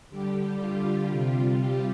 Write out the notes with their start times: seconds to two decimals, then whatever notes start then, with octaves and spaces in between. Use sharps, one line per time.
0.10 D3 G3 G4
0.60 F4
1.11 C3 G3
1.61 G4